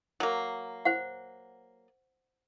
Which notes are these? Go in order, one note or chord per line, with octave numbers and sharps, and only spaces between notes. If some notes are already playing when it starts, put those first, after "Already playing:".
F#3 A#3
C5 F#5